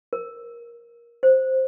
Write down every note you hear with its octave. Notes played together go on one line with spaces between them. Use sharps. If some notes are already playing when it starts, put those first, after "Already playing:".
A#4
C5